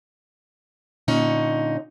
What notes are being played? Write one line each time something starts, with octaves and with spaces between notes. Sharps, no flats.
A#2 D3 C#4 D#4